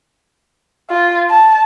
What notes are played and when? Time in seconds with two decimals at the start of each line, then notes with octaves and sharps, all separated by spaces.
0.90 F4
1.30 A5